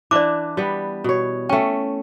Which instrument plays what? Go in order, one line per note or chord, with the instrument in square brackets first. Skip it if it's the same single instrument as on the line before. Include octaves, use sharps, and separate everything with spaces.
[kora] E3 D4 [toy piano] D5 D6
[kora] G3 B3
B2 C#5
[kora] A3 C#4 [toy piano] G5